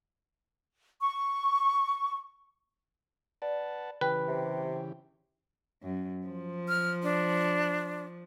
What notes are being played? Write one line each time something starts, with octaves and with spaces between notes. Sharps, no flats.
C#6
B4 D5 F#5 A5
C#3 E3 G4 B4 G5
C3
F#2
F3
F6
D4